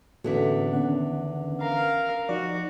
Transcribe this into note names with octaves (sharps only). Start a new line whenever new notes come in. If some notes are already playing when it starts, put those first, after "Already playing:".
E2 A2 D3 A#3 C#4 F#4 A4 E5
D#3 B3 C#4 D4 F#5
A#4 F5 A#5
F3 D#4 F#4 D5